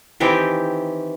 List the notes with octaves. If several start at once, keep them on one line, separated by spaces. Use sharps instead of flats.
D#3 E3 C4 G4